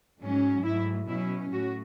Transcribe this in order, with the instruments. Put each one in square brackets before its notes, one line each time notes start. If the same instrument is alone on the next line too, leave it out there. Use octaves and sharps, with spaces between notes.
[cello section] G#2 F#3 C#4
G#2 F#3 A3 E4
B2 F#3 C#4 E4
A2 F#4